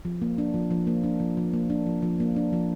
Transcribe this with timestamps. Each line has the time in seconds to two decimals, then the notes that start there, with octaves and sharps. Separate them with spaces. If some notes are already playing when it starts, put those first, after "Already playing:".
0.05 F3
0.22 A#3
0.38 D4
0.54 F3
0.71 F3
0.87 A#3
1.04 D4
1.20 F3
1.37 F3
1.53 A#3
1.70 D4
1.86 F3
2.02 F3
2.20 A#3
2.36 D4
2.53 F3